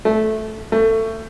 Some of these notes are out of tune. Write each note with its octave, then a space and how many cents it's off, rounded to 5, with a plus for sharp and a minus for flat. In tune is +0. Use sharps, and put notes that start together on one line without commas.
A3 -10
A3 +25